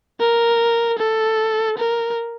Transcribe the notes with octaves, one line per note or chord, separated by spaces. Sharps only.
A#4
A4
A#4